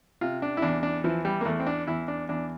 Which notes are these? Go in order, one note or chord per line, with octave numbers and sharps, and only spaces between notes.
C3 F4
D4
E4
E2 D4
D4
E3 F3
G3
A#3
E2 A3
C4
D4
E2 E4
D4
E2 D4